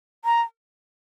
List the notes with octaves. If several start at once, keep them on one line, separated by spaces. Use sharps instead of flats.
A#5